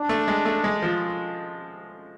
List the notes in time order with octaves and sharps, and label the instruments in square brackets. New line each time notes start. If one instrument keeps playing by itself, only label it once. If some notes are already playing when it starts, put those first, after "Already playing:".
Already playing: [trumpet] D4
[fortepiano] A3
G#3
A3
G#3
F3